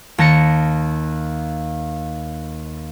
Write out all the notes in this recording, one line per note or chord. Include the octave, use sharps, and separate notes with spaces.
D#2 A5 A#6 C#7